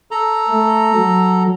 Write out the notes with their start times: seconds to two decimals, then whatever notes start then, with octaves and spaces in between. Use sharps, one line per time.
0.11 A4 A#5
0.48 A3
0.96 F#3